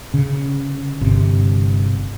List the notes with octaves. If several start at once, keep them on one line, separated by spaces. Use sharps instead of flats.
C#3
G1 C3